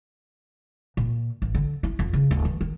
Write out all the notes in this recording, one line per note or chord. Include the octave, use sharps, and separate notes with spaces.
A#2
A1
D3
E4
F2
C#3
D1
E3
D#3